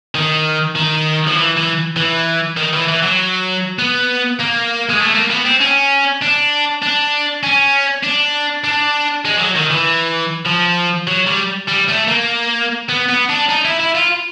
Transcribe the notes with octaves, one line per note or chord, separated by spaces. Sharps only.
D#3
D#3
F3
E3
E3
E3
D#3
E3
E3
F#3
B3
A#3
G#3
A3
A#3
B3
C4
C#4
D4
D4
C#4
D4
D4
G#3
F3
F#3
D#3
E3
F3
F#3
G3
G3
A3
A#3
B3
B3
D4
D#4
E4
E4
F4